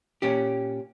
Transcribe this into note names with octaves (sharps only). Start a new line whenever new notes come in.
A#2 C#4 G4